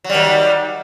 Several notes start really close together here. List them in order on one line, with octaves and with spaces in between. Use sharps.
F#3 G3 D#3